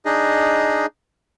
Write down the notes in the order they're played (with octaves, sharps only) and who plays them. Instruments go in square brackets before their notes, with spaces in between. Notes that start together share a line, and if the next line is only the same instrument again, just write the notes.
[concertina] D4 D#4 G#4 D#5